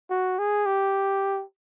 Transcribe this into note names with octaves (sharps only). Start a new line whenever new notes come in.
F#4
G#4
G4